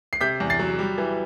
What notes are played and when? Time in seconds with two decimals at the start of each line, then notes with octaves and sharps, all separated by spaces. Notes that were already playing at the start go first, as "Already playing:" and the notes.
0.13 C7
0.21 C3 G6 B6
0.40 E2
0.50 A6 C7
0.59 F#3
0.79 G3
0.98 E3